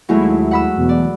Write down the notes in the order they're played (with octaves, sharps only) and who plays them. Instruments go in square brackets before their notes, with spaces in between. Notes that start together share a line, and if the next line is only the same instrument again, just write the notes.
[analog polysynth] D#2 E4 [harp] F#3 G#3 A3
[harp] F#5 B5 E6
[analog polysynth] E2 B2
[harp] D5